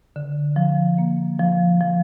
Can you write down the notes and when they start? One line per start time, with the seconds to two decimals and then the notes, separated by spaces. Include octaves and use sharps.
0.16 D3
0.56 F3
0.98 A#3
1.39 F3
1.81 F3